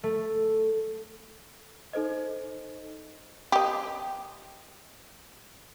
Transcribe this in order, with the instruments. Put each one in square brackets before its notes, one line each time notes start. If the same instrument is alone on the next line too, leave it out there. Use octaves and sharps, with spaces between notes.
[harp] A3
[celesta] D#4 A4 C5 D#5
[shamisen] G4 D#5